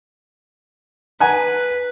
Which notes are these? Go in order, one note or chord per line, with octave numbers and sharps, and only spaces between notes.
B4 F#5 G#5 A#5